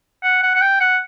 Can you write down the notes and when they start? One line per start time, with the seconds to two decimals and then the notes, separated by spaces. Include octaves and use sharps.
0.23 F#5
0.43 F#5
0.55 F#5
0.62 G5
0.81 F#5